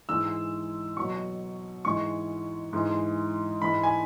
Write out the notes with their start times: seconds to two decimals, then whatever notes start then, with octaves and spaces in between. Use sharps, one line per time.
0.09 G#2 E3 G#3 E6
0.97 B2 F#3 C#6
1.85 G#2 E3 G#3 C#6
2.73 G#2 E3 G#3
3.62 G#2 E3 G#3 B5
3.83 G#5